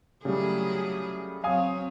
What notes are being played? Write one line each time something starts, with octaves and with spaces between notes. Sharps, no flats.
C#3 F#3 G3 A3 E4 G#4
F#3 C4 C#5 F5 G#5 D#6